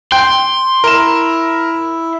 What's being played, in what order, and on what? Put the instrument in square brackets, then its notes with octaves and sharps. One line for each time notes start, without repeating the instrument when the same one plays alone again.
[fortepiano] G5 [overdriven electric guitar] C6
[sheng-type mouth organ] E4 [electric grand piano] A#4 E7